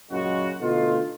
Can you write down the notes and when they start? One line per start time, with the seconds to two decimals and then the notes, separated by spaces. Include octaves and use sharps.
0.11 F#2 A#2 C#3 G#3 F#4
0.60 B2 D3 A3 D#4 F4